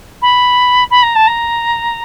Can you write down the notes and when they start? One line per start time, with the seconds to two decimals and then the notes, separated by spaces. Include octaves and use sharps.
0.22 B5
0.90 B5
1.02 A#5
1.15 A5
1.27 A#5